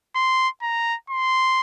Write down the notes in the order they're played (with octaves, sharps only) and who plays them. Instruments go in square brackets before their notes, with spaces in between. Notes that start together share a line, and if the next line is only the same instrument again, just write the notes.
[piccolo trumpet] C6
A#5
C6